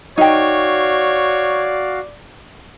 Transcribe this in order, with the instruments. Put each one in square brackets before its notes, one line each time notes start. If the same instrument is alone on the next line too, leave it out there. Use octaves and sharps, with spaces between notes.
[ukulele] D#4 G5 [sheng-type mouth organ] F#4 F5 [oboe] C#5 [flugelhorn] D5